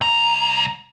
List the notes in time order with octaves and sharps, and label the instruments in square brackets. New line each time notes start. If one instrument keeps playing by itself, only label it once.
[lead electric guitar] C2 A#5